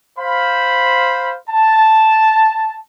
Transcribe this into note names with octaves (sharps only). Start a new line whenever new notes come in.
C5 F5 B5
A5